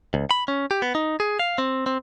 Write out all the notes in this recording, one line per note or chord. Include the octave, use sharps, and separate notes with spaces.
C#2
B5
C#4
G4
B3
D#4
G#4
F5
C4
C4